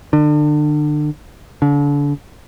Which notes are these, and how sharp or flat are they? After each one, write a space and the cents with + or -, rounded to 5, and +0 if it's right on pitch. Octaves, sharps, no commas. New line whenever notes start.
D3 +35
D3 -35